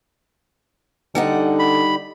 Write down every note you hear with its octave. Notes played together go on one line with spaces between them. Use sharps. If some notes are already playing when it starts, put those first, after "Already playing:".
D3 G3 D#4 F#5
B5